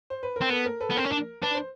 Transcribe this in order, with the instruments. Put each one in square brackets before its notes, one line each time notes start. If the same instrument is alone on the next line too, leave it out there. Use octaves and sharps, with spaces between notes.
[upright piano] C5
B4
A#4
[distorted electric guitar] C4
[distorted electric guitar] B3 [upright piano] A4
[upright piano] A#4
A4 B4
[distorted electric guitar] B3
[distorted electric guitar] C4 [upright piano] A#4
[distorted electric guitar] C#4
D4
[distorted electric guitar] D4 [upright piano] B4
[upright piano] C5